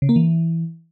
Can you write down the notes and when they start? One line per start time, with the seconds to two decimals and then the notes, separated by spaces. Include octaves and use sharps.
0.02 C#3
0.09 A#3
0.16 E3